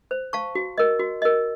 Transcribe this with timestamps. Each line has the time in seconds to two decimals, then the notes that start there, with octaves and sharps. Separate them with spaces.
0.11 C5
0.33 F5 A5 C#6
0.55 F#4
0.78 A#4 D#5
0.99 F#4
1.22 A#4 D#5